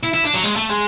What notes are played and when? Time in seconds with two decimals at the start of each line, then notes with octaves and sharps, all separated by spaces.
0.03 E4
0.13 E4
0.24 D4
0.33 F#3
0.43 G#3
0.56 A3
0.70 G#3